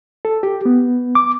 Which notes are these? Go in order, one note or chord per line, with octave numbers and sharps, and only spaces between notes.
A4
G4
B3
D6